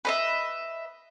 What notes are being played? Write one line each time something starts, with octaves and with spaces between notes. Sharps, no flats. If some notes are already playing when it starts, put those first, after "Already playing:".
B4 D#5 E5